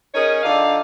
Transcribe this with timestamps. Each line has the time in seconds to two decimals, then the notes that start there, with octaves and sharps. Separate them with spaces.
0.14 C#4 D#4 G#4 A#4 C#5
0.43 D3 D#4 F4 D5 F5